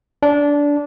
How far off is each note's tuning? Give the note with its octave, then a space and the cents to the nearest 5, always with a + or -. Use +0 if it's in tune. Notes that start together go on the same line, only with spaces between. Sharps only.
D4 -20